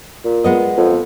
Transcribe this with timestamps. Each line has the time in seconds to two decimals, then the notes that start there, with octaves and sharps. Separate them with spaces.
0.25 A#2
0.44 G#3 B3 D#5
0.77 F2